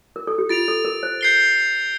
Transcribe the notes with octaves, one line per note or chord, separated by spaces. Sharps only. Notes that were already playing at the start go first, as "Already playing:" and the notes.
A#4
A4
G4
F4 A6 D7 F7
A4
A#4
C5
G6 C7 G7